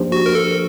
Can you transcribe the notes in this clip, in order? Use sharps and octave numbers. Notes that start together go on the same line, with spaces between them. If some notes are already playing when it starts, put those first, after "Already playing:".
Already playing: F3 A#3 D4 G4 C5
F#4
A#4
A4